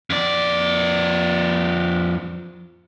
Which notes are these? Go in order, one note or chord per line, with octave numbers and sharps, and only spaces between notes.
F2 D5